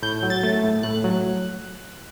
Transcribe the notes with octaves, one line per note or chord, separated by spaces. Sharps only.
A2 G6
F#3
A6
A3
A2
A2 F#6
F#3